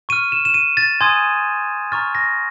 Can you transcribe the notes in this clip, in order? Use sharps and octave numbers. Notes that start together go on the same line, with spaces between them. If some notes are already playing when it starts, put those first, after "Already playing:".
C#6 F6 D#7
E7
E7
D#7
A6
G#5 C6 D#6 G6 G#6
A#5 C#6 F6 A6
A#6